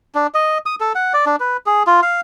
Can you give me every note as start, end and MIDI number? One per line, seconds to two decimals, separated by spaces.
0.15 0.27 62
0.34 0.58 75
0.66 0.75 87
0.80 0.93 69
0.95 1.13 78
1.13 1.25 74
1.26 1.36 62
1.40 1.57 71
1.66 1.83 68
1.87 2.01 65
2.02 2.21 77